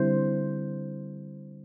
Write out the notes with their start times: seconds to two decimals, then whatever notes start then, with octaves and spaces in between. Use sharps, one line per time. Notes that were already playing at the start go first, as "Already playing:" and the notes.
Already playing: D3 G3 C4 E4 C5